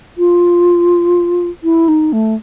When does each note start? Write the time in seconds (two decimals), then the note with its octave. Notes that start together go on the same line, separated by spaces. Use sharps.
0.18 F4
1.64 E4
1.88 D#4
2.13 A3